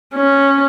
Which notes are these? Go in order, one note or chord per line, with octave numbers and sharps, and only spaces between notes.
C#4